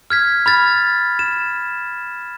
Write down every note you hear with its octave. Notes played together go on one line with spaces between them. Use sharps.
F6 G#6 B6
B5 F6 A6
E7